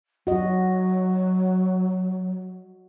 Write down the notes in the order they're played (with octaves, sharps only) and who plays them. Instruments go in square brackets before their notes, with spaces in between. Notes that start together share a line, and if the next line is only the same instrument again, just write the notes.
[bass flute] F#3 [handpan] F#4 D#5